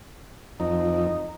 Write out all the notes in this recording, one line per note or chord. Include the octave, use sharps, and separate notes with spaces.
F2 D#4